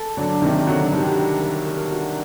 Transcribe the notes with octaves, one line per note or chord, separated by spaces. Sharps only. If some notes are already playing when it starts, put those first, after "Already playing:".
Already playing: A4
D3 F#3 D4
C3 D#3 A#4
D3 F#3 F#4
D#3 G3 D4
D4
A#4
A#4
F#4